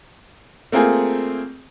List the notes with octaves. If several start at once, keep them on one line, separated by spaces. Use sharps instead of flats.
A3 A#3 C4 F4 G#4